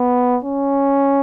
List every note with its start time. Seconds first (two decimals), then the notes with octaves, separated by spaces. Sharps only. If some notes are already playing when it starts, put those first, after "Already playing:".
Already playing: B3
0.44 C#4